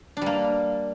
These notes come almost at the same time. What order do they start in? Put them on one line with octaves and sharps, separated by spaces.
D4 G3 A#3